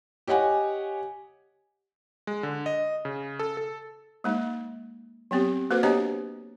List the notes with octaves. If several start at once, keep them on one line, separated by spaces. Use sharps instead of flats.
G4 C#5 D#5 F#5 G#5
G#3
D3
D#5
C#3
A4
A4
G#3 A#3 D#4
F#3 B3 C4 G4
A#3 F#4 A4 B4 C5
B3 D4 G4 C#5 D#5 A#5